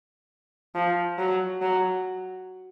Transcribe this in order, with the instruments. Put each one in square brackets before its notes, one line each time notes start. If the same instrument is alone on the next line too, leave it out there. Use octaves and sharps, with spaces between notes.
[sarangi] F3
F#3
F#3